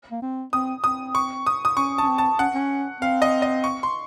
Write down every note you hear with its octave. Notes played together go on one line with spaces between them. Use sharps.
A#3
C4
C4 D#6
C4 D#6
C#6
D#6
D#6
C#4 C#6
C#4 A5
C4
A5
C#4 F#5
C#4
C4 F5
D#5
D#5
C#6
C6